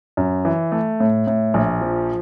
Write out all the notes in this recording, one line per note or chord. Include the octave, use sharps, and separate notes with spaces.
F#2
E3
A3
A2
A2
A#1
F3